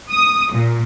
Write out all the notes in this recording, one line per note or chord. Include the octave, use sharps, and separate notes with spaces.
D#6
A#2